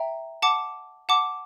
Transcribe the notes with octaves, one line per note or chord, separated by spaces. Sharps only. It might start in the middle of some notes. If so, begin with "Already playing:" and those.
Already playing: E5 G5 A#5
F#5 A5 D6
F#5 A5 D6